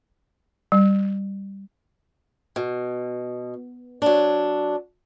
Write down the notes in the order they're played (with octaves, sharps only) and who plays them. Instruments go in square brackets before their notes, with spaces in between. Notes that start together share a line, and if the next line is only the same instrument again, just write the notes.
[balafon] G3
[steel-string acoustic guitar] B2
F#3 D4